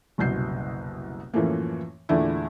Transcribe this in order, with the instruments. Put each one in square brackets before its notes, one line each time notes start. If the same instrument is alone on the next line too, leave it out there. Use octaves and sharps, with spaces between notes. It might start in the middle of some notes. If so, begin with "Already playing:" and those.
[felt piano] F#1 C2 B2 G6 C7
F#2 A2 E3 F3 A3 A#3
E2 A#2 D3 A3 D4 E4